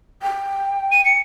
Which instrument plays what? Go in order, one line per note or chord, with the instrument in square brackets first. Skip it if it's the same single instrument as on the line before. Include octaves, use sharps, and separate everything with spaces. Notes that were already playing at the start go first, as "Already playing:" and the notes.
[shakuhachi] G5
[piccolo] D#7
C#7